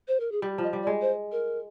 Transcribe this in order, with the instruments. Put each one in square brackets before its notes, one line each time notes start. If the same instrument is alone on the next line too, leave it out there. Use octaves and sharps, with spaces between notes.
[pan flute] C5
A#4
G#4
[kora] G3 [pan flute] G4
[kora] F3 [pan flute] D#5
[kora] G3
[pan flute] D5
[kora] G#3
[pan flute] C5
A#4